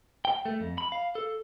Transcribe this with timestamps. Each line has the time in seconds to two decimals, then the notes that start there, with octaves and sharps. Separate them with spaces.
0.25 G5
0.46 A3
0.61 F2
0.78 B5
0.92 F5
1.15 A4